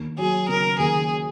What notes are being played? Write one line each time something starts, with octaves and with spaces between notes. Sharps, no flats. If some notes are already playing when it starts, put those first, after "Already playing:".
Already playing: D#2
F#3 G#4
C#3 A#4
D#2 G#4